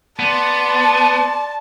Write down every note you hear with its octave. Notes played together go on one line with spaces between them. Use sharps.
B3 D5 A5 C6